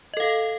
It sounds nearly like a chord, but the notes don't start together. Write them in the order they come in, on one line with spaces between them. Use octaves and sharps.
D#5 A4 F5